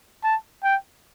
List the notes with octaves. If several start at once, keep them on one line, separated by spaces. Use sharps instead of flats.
A5
G5